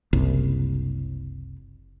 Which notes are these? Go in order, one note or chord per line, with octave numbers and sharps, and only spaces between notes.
F#1 C2